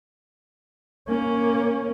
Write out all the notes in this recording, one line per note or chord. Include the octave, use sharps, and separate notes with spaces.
A#3 C#4